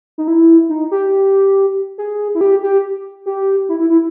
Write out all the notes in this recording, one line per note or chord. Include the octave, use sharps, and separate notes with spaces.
D#4
E4
D#4
G4
G#4
E4
G4
G4
G4
E4
E4
E4